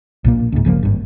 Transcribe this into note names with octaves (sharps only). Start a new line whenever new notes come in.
A#1 A#2 A#3
C#2 G#2
G1 C#3 F3 A#3
G#1 G2